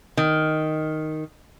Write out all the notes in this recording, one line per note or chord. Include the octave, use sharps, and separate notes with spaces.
D#3